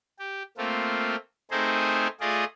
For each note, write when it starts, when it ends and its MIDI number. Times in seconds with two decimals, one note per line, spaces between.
0.19 0.43 67
0.58 1.16 57
0.58 1.16 58
0.58 1.16 60
0.58 1.16 65
1.51 2.07 57
1.51 2.07 60
1.51 2.07 63
1.51 2.07 68
1.51 2.07 70
1.51 2.07 72
2.20 2.44 57
2.20 2.44 65
2.20 2.44 68
2.20 2.44 74
2.20 2.44 75